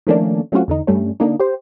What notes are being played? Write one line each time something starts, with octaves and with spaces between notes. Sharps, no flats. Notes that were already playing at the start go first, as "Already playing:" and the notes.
D#3 F3 A3 A#3 C#4 D4
F#3 A3 C4 C#4 F4 F#4
E2 D3 D#4
G2 G3 A3 C#4
D3 A#3 D4 D#4
G4 C5